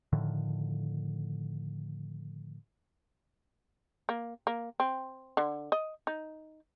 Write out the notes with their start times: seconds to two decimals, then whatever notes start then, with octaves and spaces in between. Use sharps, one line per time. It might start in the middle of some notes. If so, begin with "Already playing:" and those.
0.13 A2 D3 D#3 F3
4.09 A#3
4.47 A#3
4.80 C4
5.37 D3
5.72 D#5
6.07 D#4